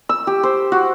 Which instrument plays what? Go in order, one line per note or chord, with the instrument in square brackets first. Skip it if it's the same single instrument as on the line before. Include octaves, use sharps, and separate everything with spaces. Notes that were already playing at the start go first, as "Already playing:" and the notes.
[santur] E6
G4
C5
F#4